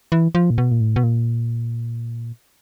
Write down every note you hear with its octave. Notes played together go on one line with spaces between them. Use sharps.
E3
F3
A#2
B2
A#2
A2
B2
A#2